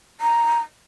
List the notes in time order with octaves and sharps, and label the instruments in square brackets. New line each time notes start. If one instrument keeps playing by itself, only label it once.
[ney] A#5